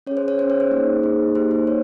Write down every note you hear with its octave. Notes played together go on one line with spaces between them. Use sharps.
C#4 G#4 C#5
C5
C#5
C#4 G#4 C5
C#5
C5
A#3 D#4 G#4
A#3 D#4 G#4
A#3 D#4 G4 C5
C5
A#3 C#5